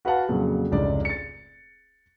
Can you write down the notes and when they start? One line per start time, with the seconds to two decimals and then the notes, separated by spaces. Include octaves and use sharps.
0.05 F#4 B4 F5 F#5 A5
0.29 F2 A#2 C#3 F#3
0.71 F1 C#2 G#2 D4 D5
1.05 A6 C#7